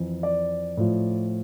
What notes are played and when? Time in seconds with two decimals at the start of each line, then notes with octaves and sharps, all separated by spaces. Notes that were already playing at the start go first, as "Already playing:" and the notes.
Already playing: F2 E3
0.23 D5
0.77 A2 F3